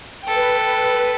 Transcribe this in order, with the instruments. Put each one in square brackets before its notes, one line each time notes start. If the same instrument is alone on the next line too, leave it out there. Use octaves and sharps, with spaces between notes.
[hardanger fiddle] A4 G5 [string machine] B4